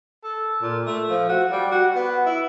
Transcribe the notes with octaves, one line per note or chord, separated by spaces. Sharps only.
A4
A#2
A3
F3
F#4
G3
F#4
B3
E4